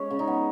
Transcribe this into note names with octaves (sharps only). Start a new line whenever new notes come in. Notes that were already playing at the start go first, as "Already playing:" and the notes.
Already playing: G#3 C#4 C#5
C#3
D#4
B3